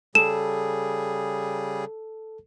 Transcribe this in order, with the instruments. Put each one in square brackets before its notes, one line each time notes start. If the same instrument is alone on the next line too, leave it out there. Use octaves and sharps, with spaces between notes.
[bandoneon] C#3 G3 G#4 [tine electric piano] A4 [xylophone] E7